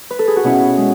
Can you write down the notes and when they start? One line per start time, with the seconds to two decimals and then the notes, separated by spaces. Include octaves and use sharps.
0.11 B4
0.19 A4
0.28 G#4
0.36 F#4
0.44 B2 C#4 E4
0.77 G#3